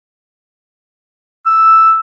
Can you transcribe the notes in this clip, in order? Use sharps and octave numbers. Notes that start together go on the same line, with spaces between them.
E6